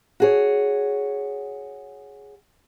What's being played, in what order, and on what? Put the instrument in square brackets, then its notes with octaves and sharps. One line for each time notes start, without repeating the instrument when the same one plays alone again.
[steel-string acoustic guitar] F#4 G#4 C#5